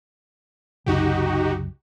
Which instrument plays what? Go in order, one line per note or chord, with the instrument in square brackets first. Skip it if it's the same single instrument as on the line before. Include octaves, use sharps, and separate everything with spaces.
[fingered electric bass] C2 F#2 C#3 [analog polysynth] D#4 F#4 G4